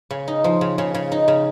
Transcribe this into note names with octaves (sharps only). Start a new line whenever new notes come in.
C#3
D#4
F3
C#3
C#3
C#3
D#4
C#3